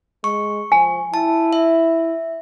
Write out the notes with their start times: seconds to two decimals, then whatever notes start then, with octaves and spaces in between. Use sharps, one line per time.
0.24 G#3 C#6
0.72 F3 G#5
1.14 E4 A5
1.53 E5